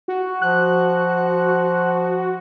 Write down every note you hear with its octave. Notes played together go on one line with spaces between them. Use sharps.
F#4
F3 F#6